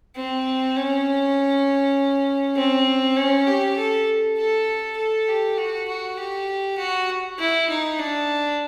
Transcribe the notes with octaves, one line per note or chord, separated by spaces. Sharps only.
C4
C#4
C4
C#4
G4
A4
A4
A4
G4
F#4
F#4
G4
F#4
E4
D#4
D4